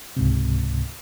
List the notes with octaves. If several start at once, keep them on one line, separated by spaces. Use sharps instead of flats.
C#2 G#2 C3